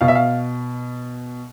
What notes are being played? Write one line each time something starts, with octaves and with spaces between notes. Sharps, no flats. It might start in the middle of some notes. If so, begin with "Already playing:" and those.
B2 F5
E5
F5